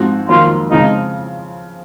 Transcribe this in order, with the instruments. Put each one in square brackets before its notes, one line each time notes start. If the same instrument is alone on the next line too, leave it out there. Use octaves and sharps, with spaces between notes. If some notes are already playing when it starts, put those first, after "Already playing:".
Already playing: [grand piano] G#2 F3 C4 F#4
[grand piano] F2 D#3 F#3 A#3 [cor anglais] F4
[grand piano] C#3 F3 G#3 C4 F4 [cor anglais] D#4